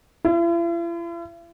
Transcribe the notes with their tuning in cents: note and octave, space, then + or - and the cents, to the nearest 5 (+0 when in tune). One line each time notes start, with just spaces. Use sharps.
E4 +45